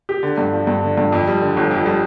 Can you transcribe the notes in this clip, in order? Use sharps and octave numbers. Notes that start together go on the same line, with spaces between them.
G4
D3
G2
F3
G2
D3
G2
F2
G3
D3
G1
F2
G3